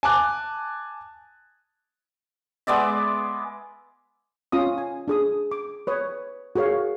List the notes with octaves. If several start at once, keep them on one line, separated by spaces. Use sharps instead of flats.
G#5 A5 D6 F#6
G#3 B3 D5 E5
C#4 F4 F5 D#6
G#5
D4 G#4 D#6
D6
B4 C#5 D#6
F#4 G#4 A#4 C#5 F5